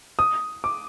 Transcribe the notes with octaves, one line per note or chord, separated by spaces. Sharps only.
D#6
D6